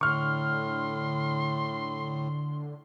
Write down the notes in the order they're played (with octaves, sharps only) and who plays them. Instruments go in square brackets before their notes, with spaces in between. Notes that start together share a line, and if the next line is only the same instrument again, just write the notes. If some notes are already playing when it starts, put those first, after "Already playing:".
[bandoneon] A2 [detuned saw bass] D3 [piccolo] C6 [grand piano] C#6 F6